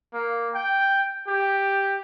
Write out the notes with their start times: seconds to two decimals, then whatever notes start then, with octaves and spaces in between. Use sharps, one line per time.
0.14 A#3
0.54 G5
1.27 G4